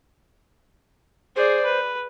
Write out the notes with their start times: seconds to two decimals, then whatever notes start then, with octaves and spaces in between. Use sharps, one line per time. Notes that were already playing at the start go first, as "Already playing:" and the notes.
1.36 G#4 C5 D5
1.65 B4